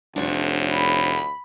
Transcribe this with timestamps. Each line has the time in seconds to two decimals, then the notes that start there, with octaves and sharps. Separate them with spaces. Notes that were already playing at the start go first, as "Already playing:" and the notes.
0.16 F1 D2 D4 C5 C#5
0.73 B5